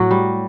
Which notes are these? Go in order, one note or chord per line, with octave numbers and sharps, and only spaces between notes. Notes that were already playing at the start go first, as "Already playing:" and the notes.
Already playing: A2 F#3 F#4
G3